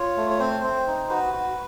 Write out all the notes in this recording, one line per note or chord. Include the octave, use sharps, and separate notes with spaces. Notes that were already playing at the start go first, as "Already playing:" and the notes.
Already playing: F4 C#5
A3
C#5
C4 C5
C4
D#4
F#4 B4
F#4